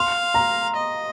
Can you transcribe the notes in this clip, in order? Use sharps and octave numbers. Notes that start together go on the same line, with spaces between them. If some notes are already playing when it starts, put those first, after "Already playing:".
Already playing: F5 C6
A#5
D#5